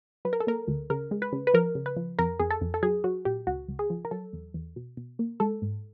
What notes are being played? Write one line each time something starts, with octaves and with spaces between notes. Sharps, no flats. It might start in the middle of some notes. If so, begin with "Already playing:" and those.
F#3 B4
A#4
A4
A#3 A#4
D2
C#3 A#4
G#3
B4
C#3
B4
F3 A#4
C#3
B4
F3
F2 A#4
F2 G#4
A4
F2
A4
F#3 G#4
F#3 F#4
A#2 G4
C#2 F#4
C#2
G#4
F3
A#4
F#3 A4
E2
E2
B2
B2
A#3
G#3 A4
G#2